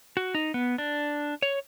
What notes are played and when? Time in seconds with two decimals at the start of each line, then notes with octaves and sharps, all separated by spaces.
0.17 F#4
0.35 D#4
0.54 B3
0.78 D4
1.42 C#5